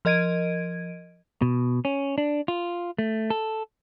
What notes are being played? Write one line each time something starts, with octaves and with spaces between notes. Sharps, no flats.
F3 A#4 D#5 G#6 D7 D#7
B2
C#4
D4
F4
A3
A4